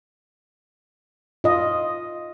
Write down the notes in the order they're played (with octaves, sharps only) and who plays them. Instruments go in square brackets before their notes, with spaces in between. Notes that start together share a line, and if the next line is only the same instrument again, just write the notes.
[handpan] F4 D#5